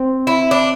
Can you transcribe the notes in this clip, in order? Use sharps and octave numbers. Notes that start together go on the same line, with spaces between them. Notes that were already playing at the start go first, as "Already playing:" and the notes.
Already playing: C4
E4
D4